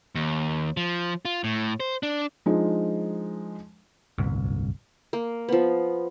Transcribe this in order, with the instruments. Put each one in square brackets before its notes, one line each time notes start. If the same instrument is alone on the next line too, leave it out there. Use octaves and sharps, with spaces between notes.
[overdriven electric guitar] D#2
F3
F4
A2
C5
D4
[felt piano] F3 G#3 D4 D#4
[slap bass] D1 G1 C2
[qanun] A#3
F3 B3